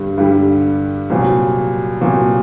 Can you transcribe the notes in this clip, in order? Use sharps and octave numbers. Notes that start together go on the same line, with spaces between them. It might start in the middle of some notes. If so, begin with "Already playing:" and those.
Already playing: G2 D3 G3
G2 D3 G3
C2 A#2 F#3
C2 A#2 F#3